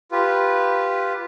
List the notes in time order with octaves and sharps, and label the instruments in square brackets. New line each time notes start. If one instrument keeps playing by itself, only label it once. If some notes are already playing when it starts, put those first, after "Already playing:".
[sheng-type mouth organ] F4 G4 B4